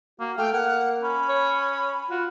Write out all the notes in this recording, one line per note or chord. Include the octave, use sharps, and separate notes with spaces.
A#3 F#4
A3 F5 G5
A#3 F#5
C#4 B5
C#5
F4 F#4